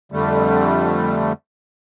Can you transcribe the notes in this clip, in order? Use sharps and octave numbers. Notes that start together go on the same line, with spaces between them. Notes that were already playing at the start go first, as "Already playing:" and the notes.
F2 D3 G3 A3